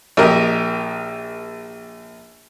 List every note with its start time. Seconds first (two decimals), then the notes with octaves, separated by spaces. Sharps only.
0.17 A#1 G4 A#4 D#5